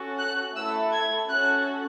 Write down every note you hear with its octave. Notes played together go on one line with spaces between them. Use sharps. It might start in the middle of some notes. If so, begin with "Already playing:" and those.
Already playing: C#4 F#4 A4
F#6
A3 E4 A4 E6
G#6
C#4 F#4 A4 F#6